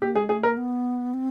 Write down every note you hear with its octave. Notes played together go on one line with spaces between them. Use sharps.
A#3 G4
G#3 G#4
A3 G#4
A#3 A#4
B3
C4